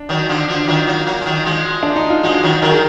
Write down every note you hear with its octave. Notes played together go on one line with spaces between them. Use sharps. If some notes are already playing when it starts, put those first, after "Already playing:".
Already playing: D4
D#3 F#3
D3 F3
D3 F3
D#3 F#3 F4
F#3 A#3
F#3 A#3
G#3
D#3 F#3
F3 G#3
D4
D#4
F4
F3 G#3 F#4
D#3 F#3
D#3 F#3 A#4
G#4